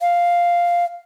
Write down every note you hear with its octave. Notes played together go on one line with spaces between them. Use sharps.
F5